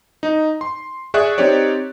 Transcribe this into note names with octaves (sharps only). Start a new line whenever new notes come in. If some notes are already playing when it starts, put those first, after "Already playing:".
D#4
C6
G#4 D5 E5 C#6 F#6
C4 D#4 G4 C#5 D5